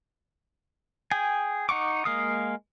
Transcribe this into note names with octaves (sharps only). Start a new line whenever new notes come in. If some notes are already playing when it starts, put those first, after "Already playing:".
G#4 G5 G#5
D#4 F#5 C#6 D6
G#3 A#3 F5 D#6